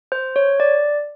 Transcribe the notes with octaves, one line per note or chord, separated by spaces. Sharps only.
C5
C#5
D5